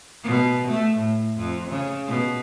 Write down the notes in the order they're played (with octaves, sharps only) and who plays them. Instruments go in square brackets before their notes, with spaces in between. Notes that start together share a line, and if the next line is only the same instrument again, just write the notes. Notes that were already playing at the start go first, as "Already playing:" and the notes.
[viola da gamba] B2
A3
A2
F2
C#3
B2